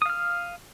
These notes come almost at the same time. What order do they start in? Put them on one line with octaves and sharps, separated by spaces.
D#6 F5 F6